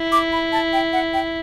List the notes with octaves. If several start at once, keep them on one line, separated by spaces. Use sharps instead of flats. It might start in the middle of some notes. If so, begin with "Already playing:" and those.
Already playing: E4
D6
B5
A5
G5
F#5
G5